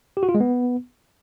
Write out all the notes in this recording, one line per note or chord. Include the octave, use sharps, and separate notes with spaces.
G4
F#4
F4
G#3
B3